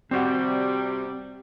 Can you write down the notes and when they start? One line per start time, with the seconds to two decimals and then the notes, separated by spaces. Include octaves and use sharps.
0.11 C3 G3 C4 F#4 F#5